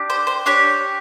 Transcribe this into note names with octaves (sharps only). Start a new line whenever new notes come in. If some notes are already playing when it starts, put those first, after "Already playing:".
Already playing: D4 G4
C5
C5
D4 G4 C#5